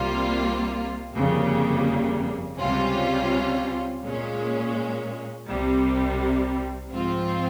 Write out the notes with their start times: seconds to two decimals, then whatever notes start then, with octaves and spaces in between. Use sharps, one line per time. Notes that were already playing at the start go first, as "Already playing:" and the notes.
Already playing: C2 C3 G3 A#3 F4
1.15 G1 F2 C#3 G3 A#3
2.59 C#2 C3 G3 C#4 F4
4.04 A#2 G#3 C#4
5.48 C2 C3 G3
6.92 G#2 F3 C4 F4